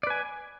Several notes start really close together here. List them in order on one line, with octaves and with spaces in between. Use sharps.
D5 B4 G#5